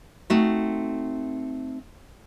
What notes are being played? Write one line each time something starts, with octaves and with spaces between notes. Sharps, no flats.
A3 C4 D#4 F#4